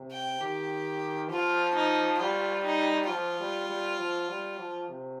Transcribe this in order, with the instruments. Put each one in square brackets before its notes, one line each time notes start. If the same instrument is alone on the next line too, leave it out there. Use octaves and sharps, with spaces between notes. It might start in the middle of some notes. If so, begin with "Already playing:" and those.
Already playing: [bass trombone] C3
[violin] G5
[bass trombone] D#3 [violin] G4
[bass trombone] F3 [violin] F4
[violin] D#4
[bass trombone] G3 [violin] F4
[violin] D#4
[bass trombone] F3 [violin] F4
[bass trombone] G3
G3
F3
G3
F3
C3